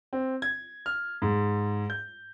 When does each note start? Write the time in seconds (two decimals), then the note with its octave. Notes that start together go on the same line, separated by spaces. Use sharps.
0.13 C4
0.42 G#6
0.86 F6
1.22 G#2
1.90 G6